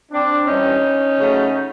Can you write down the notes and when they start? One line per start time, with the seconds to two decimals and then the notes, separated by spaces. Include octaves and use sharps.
0.12 C4 D4
0.47 G2 E3 G3 C#4 D#4
1.19 C#3 F#3 A3